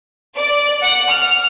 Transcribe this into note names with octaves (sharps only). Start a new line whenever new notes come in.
D5
F#5
F6